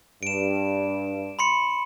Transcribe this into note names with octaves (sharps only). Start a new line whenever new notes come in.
G2 D7 E7
B5 C6 C#7